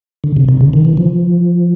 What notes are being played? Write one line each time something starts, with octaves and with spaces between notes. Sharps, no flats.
D3
C3
C3
C#3
D#3
E3
F3